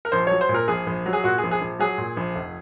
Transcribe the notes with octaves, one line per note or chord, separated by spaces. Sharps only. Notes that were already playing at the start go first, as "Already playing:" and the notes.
A#4
A#1 C5
F#3 C#5
C5
A#2
A#4
A#1 G#4
A#1
F#3
G#4
A#2 F#4
G#4
A#1
G#4
A#1
F#3 G#4
A#2
A#1
F1